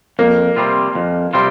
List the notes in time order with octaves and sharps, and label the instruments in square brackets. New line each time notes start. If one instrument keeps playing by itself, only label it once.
[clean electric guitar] F2 [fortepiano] A#3
[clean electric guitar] C3 G3 C4 F4
F2
C3 G3 C4 F4